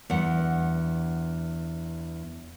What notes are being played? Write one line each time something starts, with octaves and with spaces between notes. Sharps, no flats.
E2 G2 F#5